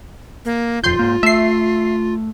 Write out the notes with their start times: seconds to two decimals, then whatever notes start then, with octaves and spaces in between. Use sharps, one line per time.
0.45 A#3
0.84 D#1 F2 F4 C6 G6
0.99 G#2 A#3
1.23 A3 E5 C7